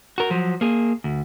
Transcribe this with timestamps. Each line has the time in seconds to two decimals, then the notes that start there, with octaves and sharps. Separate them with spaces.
0.18 F#4 A#4
0.31 F3 F#3
0.61 A#3 G#4
1.04 D2